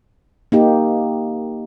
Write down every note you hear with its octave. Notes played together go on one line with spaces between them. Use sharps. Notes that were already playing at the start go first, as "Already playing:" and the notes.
A#3 D#4 G4